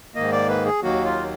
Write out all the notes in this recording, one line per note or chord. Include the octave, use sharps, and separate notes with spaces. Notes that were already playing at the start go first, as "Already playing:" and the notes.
G#2 D#3 A#3 D#5
D5
B4
G#4
D#2 D#3 F#3 A#3 F#4
F4